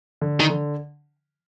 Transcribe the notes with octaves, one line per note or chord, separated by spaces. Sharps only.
D3
D#3
D3